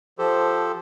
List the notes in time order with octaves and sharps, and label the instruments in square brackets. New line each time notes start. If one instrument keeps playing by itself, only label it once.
[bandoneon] F3 G4 A4 C5